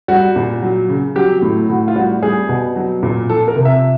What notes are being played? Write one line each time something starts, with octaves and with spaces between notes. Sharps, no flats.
G3 F#4
A#2
F#3
C#3
F#3 G4
A2
A2 F#4
F4
G3 F#4
G3 G#4
B2
F#3
A#2
F3 A4
A#4
C3
E5